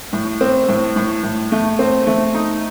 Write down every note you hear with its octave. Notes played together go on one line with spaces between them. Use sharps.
A2
C4
A2
A2
A2
A3
C4
A3
D#4